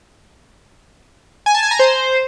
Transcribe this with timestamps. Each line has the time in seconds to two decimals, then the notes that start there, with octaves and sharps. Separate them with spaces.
1.46 G#5
1.54 A5
1.63 G#5
1.71 A#5
1.79 C5